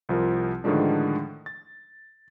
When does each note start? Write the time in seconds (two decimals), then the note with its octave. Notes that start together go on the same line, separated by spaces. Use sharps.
0.09 C2 F3 F4 A#4
0.64 A2 D3 D#3 F3 G#3 D4
1.46 A6